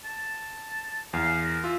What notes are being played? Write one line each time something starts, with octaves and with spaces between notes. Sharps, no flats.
A5
E2 F5
A#4
F4 E5